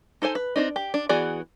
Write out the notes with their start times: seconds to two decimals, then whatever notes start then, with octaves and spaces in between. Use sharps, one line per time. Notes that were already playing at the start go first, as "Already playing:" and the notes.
0.22 D#4 A4 C5 G#5
0.35 B4
0.56 C4 D4 D#4
0.76 G4
0.94 D4
1.09 E3 B3 F#4 G#4 D5